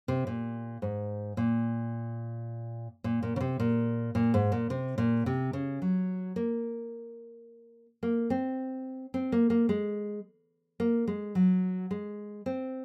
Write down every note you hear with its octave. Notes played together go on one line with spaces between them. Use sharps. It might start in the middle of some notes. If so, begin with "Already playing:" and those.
C3
A#2
G#2
A#2
A#2
A#2
C#3
C3
A#2
A#2
G#2
A#2
C3
A#2
C3
C#3
F#3
A#3
A#3
C4
C4
A#3
A#3
G#3
A#3
G#3
F#3
G#3
C4